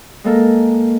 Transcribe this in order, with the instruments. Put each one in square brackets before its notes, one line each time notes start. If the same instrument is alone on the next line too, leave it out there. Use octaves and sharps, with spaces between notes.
[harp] G#3 A#3 A4 A#4